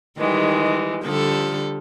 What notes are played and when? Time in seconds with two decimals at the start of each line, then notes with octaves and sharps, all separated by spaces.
0.18 D#3 E3 G3 G#3
1.05 D3 F3 G3 A4